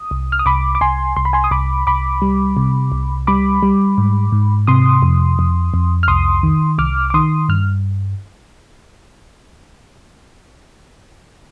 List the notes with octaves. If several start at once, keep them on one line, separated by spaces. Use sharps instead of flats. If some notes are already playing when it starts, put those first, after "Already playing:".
Already playing: D#6
C2
F6
D#6
C2 B5 D6
D6
C2 G#5 C6
C2 C6
B5
G#5 C6
D#6
C2 B5 D6
C2 B5 D6
G3
C3
C2
G3 B5 D6
G3
G#2
G#2
C3 C6 D#6
F2
F2
F2
F6
C2 C6 D#6
D#3
C2 D6 F6
D6
D#3 C6 D#6
G2 F6